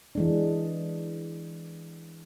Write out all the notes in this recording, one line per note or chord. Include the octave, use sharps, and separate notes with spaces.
E3 G#3 D4